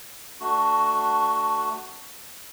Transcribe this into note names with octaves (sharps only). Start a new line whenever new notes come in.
A3 D4 F#4